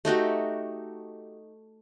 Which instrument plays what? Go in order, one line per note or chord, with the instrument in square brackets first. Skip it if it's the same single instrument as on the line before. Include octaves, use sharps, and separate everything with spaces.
[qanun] A3 D#4 F#4 G4